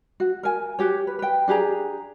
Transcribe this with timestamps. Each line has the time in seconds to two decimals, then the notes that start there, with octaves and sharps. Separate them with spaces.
0.20 F#4
0.43 A#4 G#5
0.79 F#4 G4 C#5
1.07 B4
1.19 B4 G5
1.48 D4 G4 G#4 A#5